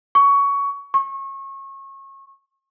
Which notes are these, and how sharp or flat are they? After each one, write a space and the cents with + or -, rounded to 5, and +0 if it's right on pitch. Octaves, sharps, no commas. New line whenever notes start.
C#6 +15
C#6 -30